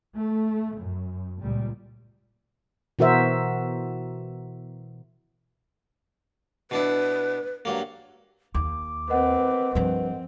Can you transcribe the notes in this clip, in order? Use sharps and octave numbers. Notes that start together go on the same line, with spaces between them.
A3
F#2
C#2 A#2 G3
B2 E3 F#4 A#4 C5 E5
B2 D4 E4 B4
G2 F#3 A#3
D#2 D6
C4 A#4 B4 D#5 F#5
G2 F3 C4 B4